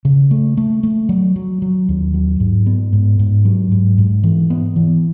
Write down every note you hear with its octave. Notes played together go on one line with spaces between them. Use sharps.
C#3
A3
A3
A3
F#3
F#3
F#3
D#2
F#3
G#2
B3
G#2
G#2
F#3
G#2
G#2
E3
B3
E3